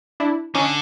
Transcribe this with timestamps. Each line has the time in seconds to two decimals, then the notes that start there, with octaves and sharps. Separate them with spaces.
0.20 D4 E4
0.55 D3 C#4 D#4